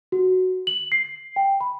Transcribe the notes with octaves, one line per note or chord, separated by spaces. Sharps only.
F#4
F#7
C7
G5
B5